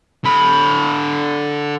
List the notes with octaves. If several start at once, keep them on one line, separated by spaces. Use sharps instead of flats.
D3 B5